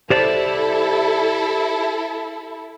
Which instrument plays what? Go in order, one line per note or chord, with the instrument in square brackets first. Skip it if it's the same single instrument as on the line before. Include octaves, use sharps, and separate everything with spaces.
[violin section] E4 A4 [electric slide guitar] G4 C5 D5